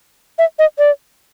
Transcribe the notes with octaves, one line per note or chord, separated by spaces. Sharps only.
E5
D#5
D5